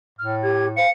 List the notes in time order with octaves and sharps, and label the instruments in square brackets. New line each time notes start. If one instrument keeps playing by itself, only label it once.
[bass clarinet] A2 [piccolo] F6
[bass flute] G4 [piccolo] G#6
[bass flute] C5 [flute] F5 [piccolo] C#7